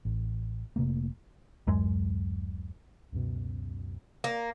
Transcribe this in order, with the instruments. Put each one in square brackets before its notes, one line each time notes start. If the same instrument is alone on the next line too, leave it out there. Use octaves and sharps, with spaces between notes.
[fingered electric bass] A1
F1 C3 A3 A#3
[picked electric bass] D1 F#2 G#3
[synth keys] C#2 F#2 B2
[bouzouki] A#3